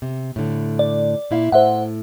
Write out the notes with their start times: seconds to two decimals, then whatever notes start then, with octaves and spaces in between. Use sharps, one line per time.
0.02 C3
0.36 A2 D3
0.79 D5
1.31 A#2 E4 F5
1.52 A2 C5 E5 F#5